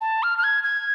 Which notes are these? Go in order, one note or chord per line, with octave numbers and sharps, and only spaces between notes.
A5
F6
F6
G#6
G#6